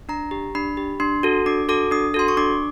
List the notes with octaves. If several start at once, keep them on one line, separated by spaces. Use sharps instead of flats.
D4 A#5
G4
D4 B5
G4
D4 C6
F#4 A4
D4 D6
F#4 A4 D6
D4 D#6
F#4 A4 C6
C#6
D4 D6